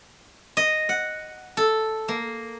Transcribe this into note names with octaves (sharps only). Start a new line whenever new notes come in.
D#5
F#5
A4
A#3